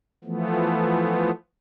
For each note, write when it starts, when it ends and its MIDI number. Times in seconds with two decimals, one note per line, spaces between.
0.24 1.31 52
0.24 1.31 53
0.24 1.31 57
0.24 1.31 59